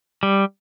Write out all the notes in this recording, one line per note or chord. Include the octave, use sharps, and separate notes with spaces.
G3